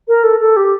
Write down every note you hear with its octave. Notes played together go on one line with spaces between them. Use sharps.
A#4
A4
A4
G4